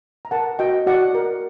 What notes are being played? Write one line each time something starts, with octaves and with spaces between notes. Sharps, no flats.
A#5
A#4 F#5 A5
F#4 D#5 G5
F#4 D5 F#5
A#4